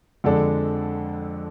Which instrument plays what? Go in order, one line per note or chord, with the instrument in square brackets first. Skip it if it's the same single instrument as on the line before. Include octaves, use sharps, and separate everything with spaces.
[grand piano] F2 D3 G#3 D4 A4